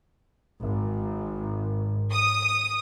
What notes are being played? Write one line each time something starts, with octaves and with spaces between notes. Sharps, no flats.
G#1
D#6